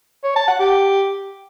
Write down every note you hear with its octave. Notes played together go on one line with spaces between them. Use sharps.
C#5
A5
F#5
G4